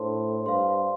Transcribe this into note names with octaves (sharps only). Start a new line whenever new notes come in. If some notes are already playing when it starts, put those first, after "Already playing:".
Already playing: A2 D4 A4 C5 A5 C6
G2 C5 F5 C6